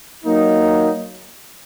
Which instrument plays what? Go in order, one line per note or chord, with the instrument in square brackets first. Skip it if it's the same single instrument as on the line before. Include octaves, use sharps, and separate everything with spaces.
[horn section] F#3 A#3 D#4